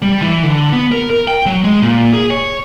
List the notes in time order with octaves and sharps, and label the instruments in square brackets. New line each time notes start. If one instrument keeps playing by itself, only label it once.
[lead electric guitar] G3
E3
D3
B3
A#4
A#4
G5
F#3
G#3
A#2
G#4
C#5